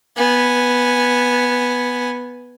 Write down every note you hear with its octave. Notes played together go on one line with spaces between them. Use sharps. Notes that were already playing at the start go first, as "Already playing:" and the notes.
B3 G#5